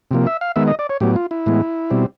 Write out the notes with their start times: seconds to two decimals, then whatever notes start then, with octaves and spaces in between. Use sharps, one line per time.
0.11 C3 F3 A#3
0.27 E5
0.41 F5
0.56 D#3 G#3 B3 E5
0.67 D#5
0.79 D5
0.89 C#5
1.00 A2 F#3 B3 G4
1.16 F4
1.31 E4
1.46 A2 E3 G#3 B3
1.91 B2 G3 C4